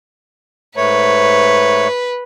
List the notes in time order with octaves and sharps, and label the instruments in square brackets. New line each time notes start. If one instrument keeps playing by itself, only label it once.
[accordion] G#2 A3 C#5 [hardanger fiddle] B4